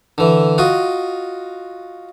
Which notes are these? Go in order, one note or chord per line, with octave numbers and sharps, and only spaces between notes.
D3 E3
F4 F#4 D#5